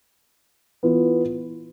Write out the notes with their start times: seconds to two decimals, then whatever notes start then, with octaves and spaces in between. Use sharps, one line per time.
0.83 E3 B3 F4